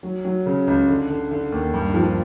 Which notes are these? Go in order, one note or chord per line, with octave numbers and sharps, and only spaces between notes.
F#3
F#3
C#3
C#2
D3
D3
D3
D#2
G2
F3